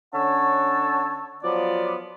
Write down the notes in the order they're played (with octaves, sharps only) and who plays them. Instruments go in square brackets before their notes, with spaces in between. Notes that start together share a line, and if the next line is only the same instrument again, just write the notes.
[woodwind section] D3 C#4 C#5 F#5 A5 E6
F3 F#3 B3 F4 D5